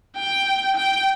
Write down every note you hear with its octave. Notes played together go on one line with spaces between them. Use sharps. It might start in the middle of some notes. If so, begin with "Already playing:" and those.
G5
G5